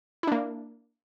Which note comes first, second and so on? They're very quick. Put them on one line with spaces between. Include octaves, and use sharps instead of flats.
E4 D4 A#3